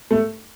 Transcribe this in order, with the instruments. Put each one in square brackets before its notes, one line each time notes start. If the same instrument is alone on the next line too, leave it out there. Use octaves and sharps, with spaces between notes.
[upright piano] A3